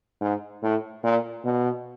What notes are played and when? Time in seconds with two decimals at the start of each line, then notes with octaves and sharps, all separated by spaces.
0.21 G#2
0.62 A2
1.03 A#2
1.44 B2